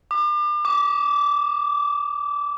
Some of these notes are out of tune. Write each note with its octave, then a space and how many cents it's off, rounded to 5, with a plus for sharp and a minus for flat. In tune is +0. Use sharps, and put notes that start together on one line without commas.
D6 +35
D6 -20